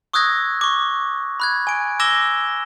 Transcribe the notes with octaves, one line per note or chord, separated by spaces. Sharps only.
C#6 D#6 E6 F#6 G#6 A#6
C#6 D6
B5 F#6 G#6
G#5 D7
D6 E6 G#6 A#6 E7 G7